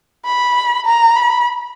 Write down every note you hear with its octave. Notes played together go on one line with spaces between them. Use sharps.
B5
A#5
B5